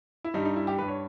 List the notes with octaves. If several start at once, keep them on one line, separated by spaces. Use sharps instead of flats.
E4
G2 G3 D#4
D#4
E4
G4
G2 G3 B4
C#5